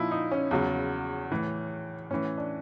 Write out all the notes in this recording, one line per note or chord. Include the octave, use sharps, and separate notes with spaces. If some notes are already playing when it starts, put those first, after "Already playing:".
Already playing: A#2 F3 D#4 E4
D#4
C#4
E2 C#3 F#3
A2 E3
A2 E3 C#4
D4